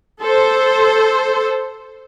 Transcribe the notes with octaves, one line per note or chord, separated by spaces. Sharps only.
A4 C5